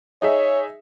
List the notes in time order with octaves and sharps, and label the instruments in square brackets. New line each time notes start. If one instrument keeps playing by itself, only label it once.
[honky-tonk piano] D#4 G#4 E5 [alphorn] C#5